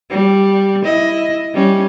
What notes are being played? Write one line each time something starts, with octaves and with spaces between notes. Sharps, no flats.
G3
E4 D#5
G3 C#4